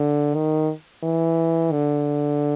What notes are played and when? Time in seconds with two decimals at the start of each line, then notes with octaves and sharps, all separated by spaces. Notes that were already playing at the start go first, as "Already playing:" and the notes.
Already playing: D3
0.35 D#3
1.03 E3
1.72 D3